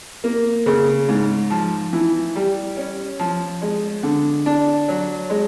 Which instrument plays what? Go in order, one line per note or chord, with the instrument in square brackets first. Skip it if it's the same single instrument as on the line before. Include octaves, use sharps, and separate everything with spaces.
[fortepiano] A#3
C#3
G#2
F3
E3
G3
C#4
F3
G#3
D3
D4
F#3
G#3